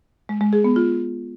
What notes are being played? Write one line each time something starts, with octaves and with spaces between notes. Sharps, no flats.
G#3
G#3
G#4
B3
F4